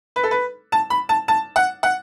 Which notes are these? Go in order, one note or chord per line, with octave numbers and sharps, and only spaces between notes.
B4
A4
B4
A5
B5
A5
A5
F#5
F#5